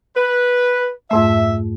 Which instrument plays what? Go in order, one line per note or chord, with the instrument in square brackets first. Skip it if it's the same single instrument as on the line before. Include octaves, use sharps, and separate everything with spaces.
[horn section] B4
[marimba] F2 G#2 A3 [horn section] E5